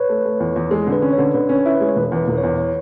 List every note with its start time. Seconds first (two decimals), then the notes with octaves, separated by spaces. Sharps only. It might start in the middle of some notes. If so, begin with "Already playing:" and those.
Already playing: B4 C#5
0.09 A3
0.25 A3
0.40 E2
0.56 E2
0.71 G#3 A4
0.87 D3
0.92 B4
1.02 C#4
1.13 C#5
1.18 D3
1.34 D3 B4
1.49 C#4 C#5
1.65 E4
1.75 B4
1.81 G#3
1.88 C#5
1.96 E1 B4
2.12 E2 B4
2.28 E1
2.38 C#5
2.43 E2
2.58 C#5